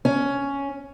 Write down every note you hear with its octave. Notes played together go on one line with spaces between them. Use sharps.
C#4